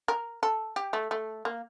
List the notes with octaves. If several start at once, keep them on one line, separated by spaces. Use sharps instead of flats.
A#4
A4
G4
A3
A3
A#3